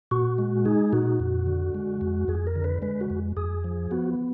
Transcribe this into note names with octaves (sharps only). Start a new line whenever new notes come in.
A#2 F#4
G#3
D#4 G#4
A#2 F#4
F2
D3
G#3
F2
F2 G#4
A#4
D3
B4
G#3 B4
F#4
F2
F2 G#4
F3
B3 F#4